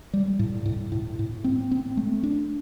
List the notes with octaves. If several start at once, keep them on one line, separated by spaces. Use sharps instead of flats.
G3
A2
A2
A2
A2
C4
C4
A3
D4